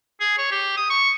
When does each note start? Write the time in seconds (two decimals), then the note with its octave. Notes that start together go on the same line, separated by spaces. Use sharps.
0.21 G#4
0.38 C#5
0.51 G4
0.77 D#6
0.90 C#6